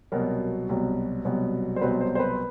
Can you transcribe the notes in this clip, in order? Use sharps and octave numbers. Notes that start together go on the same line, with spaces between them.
C2 B2 F#3 B3 A#4
C2 B2 F#3 B3
C2 B2 F#3 B3
C5
C2 B2 F#3 B3 B4
C5
C5
B4